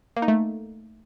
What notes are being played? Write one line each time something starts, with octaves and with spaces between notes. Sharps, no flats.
A#3
D#4
A3